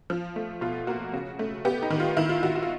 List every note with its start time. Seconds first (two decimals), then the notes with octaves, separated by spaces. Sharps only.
0.10 F3
0.36 A3
0.61 B2 F4
0.87 A#3 F#4
1.13 C#3 F#4
1.39 A3
1.65 B3 G4
1.82 D#4
1.90 D#3
2.00 F4
2.17 D#3 E4
2.29 F4
2.43 D#3 F#4
2.56 F#4
2.62 F4